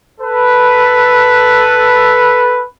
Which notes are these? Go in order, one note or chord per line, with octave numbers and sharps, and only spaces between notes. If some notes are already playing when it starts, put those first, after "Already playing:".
A4 B4